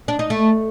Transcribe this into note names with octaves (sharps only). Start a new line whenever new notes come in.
D4
D#4
A3